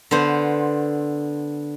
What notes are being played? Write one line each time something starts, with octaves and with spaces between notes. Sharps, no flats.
D3 B3 C5